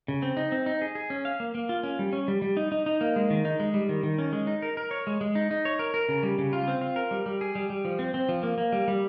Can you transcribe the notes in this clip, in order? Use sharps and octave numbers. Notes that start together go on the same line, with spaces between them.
C#3
C4
D#4
C4
D#4
G#4
G#4
C#4
F5
A#3
A#3
F4
C#4
G3
C#4
G3
G3
D#4
D#4
D#4
A#3
G#3
D#3
D#4
G#3
G3
D#3
D#3
C#4
G#3
D#4
A#4
A#4
C#5
G#3
G#3
D#4
D#4
C#5
A#4
A#4
C#3
G3
C#3
F4
C4
F4
A#4
G3
G3
G#4
G3
G3
F3
C4
C4
F3
A#3
A#3
G3
G3